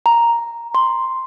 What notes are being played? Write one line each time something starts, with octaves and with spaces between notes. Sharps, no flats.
A#5
C6